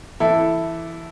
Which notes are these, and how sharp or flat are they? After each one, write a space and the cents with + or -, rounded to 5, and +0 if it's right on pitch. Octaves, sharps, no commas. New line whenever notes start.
E3 +15 E4 +0 A4 +0